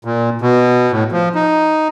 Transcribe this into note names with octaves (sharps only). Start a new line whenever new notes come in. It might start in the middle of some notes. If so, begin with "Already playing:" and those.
A#2
B2
A2
F3
D#4